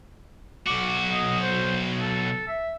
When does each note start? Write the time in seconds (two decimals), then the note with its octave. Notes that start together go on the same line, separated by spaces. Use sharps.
0.66 B1 F#4 D6
1.11 D#5
1.40 C5
2.00 A4
2.48 E5